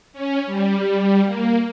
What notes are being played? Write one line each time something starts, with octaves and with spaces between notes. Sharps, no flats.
C#4
G3
A#3